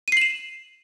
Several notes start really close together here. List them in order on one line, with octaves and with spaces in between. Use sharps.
D#7 C7 F#7 E7